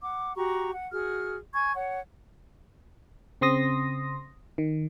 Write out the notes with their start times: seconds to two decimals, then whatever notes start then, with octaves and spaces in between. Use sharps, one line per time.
0.02 F#5 D6
0.36 F#4 G4 A#5 C#6
0.74 F#5
0.92 F#4 G#4 F6
1.54 G#5 C#6 G#6
1.75 C#5 F#5
3.41 C#3 C4 C6 D#6 A#6
4.58 D#3